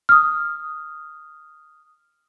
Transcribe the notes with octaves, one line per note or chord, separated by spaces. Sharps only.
D#6 F6